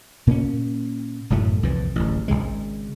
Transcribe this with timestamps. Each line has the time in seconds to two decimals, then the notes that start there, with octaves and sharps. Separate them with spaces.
0.27 A#2 A#3 B3 C#4
1.30 E1 F#2 A2 A3
1.62 C2 F2 A#2 E3
1.96 D1 A1
2.28 G#1 D#2 C#3 G#3